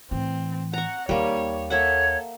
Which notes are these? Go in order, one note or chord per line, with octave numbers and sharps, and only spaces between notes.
A2 E3 C4
F#5 A#5 C#6
D#2 G3 A#3 D#4 C#5
A#3 A4 C#5 E5 F#5